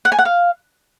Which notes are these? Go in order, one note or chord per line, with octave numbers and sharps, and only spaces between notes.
F#5
G#5
F#5
F5